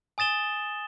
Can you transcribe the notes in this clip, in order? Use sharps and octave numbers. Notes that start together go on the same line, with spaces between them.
G#5 D#6 A6 E7 G7